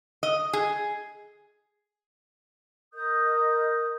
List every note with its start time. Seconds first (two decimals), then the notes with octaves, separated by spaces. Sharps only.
0.23 D#5
0.53 G#4
2.94 A#4 D#5 D#6 G6